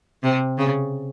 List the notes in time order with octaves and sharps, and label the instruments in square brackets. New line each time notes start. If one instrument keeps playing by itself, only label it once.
[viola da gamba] C3
C#3